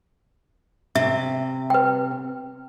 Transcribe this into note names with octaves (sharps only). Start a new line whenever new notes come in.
C3 E5
B4 G5